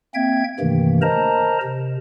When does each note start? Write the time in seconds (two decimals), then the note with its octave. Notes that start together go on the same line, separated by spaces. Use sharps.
0.14 A#3 C4 E5 G5 G#6
0.60 G2 C3 D#3 E3 A3 A#3
1.02 A#4 C5 D#5 A5 A#5
1.63 C3